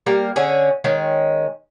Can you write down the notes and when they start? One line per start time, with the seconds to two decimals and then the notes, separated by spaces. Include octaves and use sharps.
0.06 G3 A#3 A#4
0.36 D3 C#4 G#4
0.84 D#3 G#3 C#4